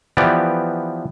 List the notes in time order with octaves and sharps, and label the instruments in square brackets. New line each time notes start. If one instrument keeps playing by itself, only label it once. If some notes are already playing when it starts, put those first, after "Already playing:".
[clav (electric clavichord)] E3 F3 B3 G4 D5